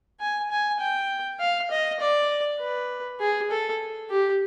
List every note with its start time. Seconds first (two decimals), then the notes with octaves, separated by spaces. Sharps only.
0.20 G#5
0.51 G#5
0.80 G5
1.40 F5
1.71 D#5
2.00 D5
2.60 B4
3.20 G#4
3.51 A4
4.10 G4